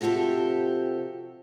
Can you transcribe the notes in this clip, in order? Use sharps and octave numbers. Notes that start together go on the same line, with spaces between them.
C3 F3 F#4 G4 A4